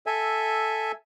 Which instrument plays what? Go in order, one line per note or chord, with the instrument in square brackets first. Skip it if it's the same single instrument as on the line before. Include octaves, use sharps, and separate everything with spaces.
[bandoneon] A4 E5 G#5